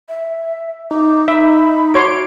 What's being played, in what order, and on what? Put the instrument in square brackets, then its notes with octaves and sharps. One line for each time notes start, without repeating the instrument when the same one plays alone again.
[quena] E5
[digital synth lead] D#4 [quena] D6
[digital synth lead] D#4 [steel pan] E5 [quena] B5
[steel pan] F#4 C#5 C6 [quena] D6 [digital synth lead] D7